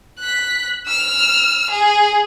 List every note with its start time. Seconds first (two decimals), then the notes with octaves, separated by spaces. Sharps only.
0.19 F#6 B6
0.87 E6 F6
1.70 G#4